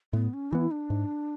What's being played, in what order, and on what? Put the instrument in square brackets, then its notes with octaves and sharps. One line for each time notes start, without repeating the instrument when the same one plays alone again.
[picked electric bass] A2 [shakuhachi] B3
[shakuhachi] C#4
[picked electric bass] E3 B3 [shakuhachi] E4
[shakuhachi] D4
[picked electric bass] G#2